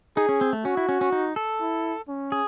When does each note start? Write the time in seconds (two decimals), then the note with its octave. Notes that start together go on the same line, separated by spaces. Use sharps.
0.17 D#4 G#4
0.29 C#4
0.41 C4
0.53 A3
0.65 C#4 F#4
0.77 E4
0.89 C#4
1.01 C#4
1.12 D#4
1.36 A4
1.61 E4
2.08 C#4
2.32 G#4